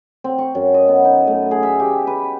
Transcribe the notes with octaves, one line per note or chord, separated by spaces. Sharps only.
C4
C#6
F#2
D#5
B3
D#4
A3
G#4
E5
G4
B4